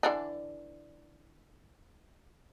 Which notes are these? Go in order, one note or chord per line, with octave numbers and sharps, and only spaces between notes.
D3 E3 D4